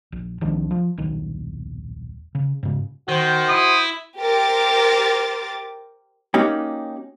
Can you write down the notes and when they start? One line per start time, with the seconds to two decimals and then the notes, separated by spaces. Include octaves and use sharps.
0.12 A#1
0.41 C2 D#3 F3 D4
0.71 F3
0.98 D#1 B1 D#3
2.35 C#3
2.63 G#2 C#3
3.09 D#3 F#4 C5
3.49 E4 D#6
4.19 G4 A#4 C5 D6 A6
6.34 A#3 C#4 D#4 F#4 G4